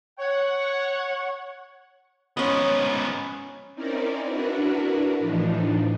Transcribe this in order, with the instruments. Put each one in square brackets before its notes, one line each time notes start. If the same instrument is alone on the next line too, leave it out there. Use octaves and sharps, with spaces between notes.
[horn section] C#5 F#5
[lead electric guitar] G#2 B3 [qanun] C#4 D#5
[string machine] C4 C#4 D#4 E4 A#4 D5
D4 E4 F#4 A#4 B4
A2 E3 F3 D4 D#4